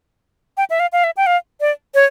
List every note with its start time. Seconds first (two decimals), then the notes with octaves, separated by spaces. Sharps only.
0.57 G5
0.70 E5
0.80 F5
0.92 F5
1.04 E5
1.17 G5
1.27 F5
1.61 D5
1.95 C#5